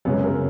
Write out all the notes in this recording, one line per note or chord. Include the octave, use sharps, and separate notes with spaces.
F#2 C#3 G#3 B3
A#4